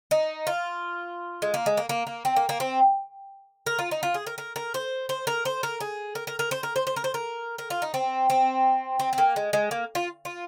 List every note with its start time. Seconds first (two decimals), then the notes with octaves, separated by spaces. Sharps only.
0.11 D#4
0.47 F4
1.42 G#3
1.54 A#3
1.66 G#3
1.77 A#3
1.89 A#3
2.07 A#3
2.25 C4
2.36 A#3
2.49 A#3
2.60 C4
3.66 A#4
3.79 F4
3.91 D#4
4.03 F4
4.14 G#4
4.27 A#4
4.38 A#4
4.56 A#4
4.74 C5
5.09 C5
5.27 A#4
5.45 C5
5.63 A#4
5.81 G#4
6.15 A#4
6.27 A#4
6.39 A#4
6.51 C5
6.63 A#4
6.76 C5
6.87 C5
6.96 A#4
7.04 C5
7.14 A#4
7.58 A#4
7.70 F4
7.82 D#4
7.94 C4
8.30 C4
9.00 C4
9.13 C4
9.18 A#3
9.36 G#3
9.53 G#3
9.71 A#3
9.95 F4
10.25 F4